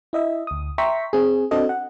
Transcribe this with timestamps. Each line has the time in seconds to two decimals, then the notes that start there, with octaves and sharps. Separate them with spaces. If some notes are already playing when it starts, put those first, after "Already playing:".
0.13 E4 D#5 E5
0.47 D2 D#6
0.78 E5 G5 A#5 C6 C#6 B6
1.13 C4 G#4
1.51 C4 D4 F#4 A4 D#5
1.69 F#5